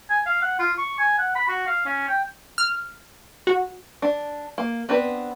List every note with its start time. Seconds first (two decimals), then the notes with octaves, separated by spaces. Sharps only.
0.10 G#5
0.26 F5
0.42 F#5
0.59 F4
0.78 C#6
0.99 G#5
1.19 F#5
1.35 B5
1.48 F#4
1.67 F5
1.86 C#4
2.08 G5
2.58 F6
3.47 F#4
4.02 D4
4.58 A#3
4.89 B3 C4 D4 B4